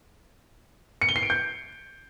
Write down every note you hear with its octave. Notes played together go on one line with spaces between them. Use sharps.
C#7
G7
C7
D7
G6